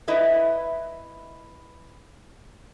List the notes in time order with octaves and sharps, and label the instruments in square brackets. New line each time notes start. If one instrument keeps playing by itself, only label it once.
[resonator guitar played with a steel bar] E4 B4 D#5 E5